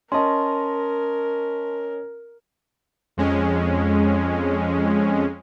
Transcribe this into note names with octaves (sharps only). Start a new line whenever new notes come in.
C#4 A#4 D#5 A5 C6
F2 G#3 C#4